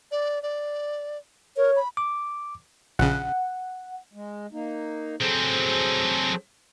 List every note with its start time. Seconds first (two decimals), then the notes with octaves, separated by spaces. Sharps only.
0.11 D5
0.43 D5
1.57 A#4 C#5
1.76 B5
1.97 D6
2.99 A#1 C#3 F#5
4.13 G#3
4.52 A#3 D#4
5.21 F#3 C4 G#4 A4 C5